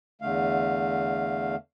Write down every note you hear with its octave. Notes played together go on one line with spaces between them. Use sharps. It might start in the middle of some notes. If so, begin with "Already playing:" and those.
E2 D3 A3 F5